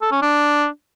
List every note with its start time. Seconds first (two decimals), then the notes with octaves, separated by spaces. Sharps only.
0.02 A4
0.12 C#4
0.22 D4